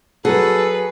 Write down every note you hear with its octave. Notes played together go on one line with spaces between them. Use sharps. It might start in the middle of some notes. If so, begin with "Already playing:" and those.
F#3 F#4 G#4 A4 B4